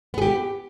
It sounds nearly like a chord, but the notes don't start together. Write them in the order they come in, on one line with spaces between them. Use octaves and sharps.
B3 G#4 G4